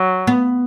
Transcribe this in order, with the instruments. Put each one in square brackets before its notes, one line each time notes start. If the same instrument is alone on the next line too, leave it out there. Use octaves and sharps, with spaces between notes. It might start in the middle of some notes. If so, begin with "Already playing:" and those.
Already playing: [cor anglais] F#3
[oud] B3